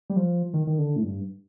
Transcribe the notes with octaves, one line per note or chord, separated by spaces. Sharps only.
G3
F3
D#3
D#3
D3
A2
G2